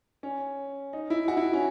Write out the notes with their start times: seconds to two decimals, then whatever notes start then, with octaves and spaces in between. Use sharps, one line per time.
0.23 C#4
0.93 D#4
1.10 E4
1.28 F#4
1.37 E4
1.53 C#4